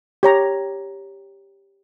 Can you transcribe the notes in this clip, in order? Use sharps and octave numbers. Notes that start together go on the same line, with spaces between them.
G4 C#5 A#5